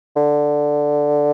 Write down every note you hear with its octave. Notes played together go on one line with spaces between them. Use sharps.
D3